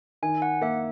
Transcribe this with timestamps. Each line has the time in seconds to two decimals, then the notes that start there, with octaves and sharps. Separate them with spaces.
0.23 D#3 G#5
0.42 F#5
0.61 A#3 E5